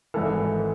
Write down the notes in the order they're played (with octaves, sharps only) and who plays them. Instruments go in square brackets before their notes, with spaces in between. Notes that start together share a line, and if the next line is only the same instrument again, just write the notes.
[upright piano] G#1 G#2 E3 A4